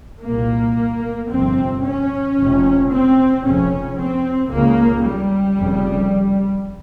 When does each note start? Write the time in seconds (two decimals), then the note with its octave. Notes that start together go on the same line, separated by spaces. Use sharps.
0.22 C2 A#2 A#3
1.29 G1 F2 C3 C4
1.83 C#4
2.37 F1 F2 C3
2.90 C4
3.44 F1 F2 C#3 C#4
3.97 C4
4.51 C#2 C#3 A#3
5.04 G3
5.59 F1 F2 C#3